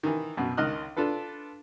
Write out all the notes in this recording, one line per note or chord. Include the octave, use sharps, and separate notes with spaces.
D#3 E3
F#2 B2
C#2 D#3 D#5 F6 F#6
D4 F4 A4 B4